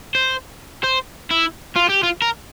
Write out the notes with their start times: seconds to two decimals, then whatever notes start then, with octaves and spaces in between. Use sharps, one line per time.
0.15 C5
0.84 C5
1.30 E4
1.76 F4
1.90 G4
2.03 F4
2.22 A#4